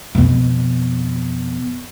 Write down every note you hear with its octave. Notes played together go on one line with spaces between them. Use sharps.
F2 B2